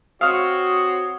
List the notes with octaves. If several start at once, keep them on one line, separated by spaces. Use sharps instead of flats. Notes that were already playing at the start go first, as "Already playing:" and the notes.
C4 F#4 C#5 F5 D#6 F6